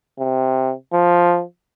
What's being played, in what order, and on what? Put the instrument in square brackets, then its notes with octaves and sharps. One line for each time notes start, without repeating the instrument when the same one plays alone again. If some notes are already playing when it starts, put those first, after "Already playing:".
[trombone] C3
F3